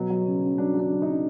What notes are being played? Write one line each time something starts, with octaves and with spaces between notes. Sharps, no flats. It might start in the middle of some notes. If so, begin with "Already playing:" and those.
Already playing: B2 F#3
F#3
C#3
C#3
F#3 D4
F#3
D4
C#3
D#4
C#3